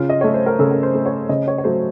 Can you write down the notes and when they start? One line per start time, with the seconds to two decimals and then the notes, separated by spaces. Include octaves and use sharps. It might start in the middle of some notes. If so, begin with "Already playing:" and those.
Already playing: C#3 F4
0.09 D#5
0.21 A3 C#5
0.34 C5
0.46 A#4
0.59 C#3 A4
0.71 A#4
0.83 C5
0.95 A3
1.06 C#5
1.29 C#3 D#5
1.48 C#5
1.58 C#5
1.64 F#3 A3 C5